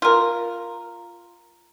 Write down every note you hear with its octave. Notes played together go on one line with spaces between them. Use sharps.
F4 A#4